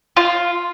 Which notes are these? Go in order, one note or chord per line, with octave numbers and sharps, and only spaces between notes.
F4